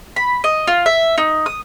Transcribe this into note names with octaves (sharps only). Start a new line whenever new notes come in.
B5
D#5
F4
E5
D#4
D#6